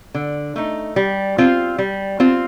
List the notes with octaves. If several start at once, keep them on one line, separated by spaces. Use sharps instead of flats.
D3
A3 D#4
G3
C4 F4
G3
C4 F4